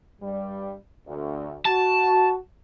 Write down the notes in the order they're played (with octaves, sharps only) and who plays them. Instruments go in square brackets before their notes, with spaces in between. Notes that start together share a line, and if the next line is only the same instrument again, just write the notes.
[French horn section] G2 G3
D2
[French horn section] F#4 [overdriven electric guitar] A5